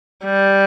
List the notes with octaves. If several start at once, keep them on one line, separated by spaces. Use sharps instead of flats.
G3